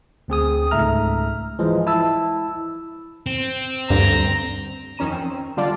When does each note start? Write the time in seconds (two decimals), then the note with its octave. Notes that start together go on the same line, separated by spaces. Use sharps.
0.28 D2 C4 G#4 D#6
0.71 C#2 G#2 A3 E5 A#5 F6
1.59 E3 F3 G#3
1.87 E4 A5 E6
3.26 C4
3.90 D2 G2 D3 A#5
4.97 F2 D#3 C#4 A#5 D#7 E7
5.11 C4
5.57 D3 G3 F4 D5 A5